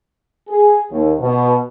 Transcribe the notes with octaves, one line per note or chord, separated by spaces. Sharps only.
G#4
D#2
B2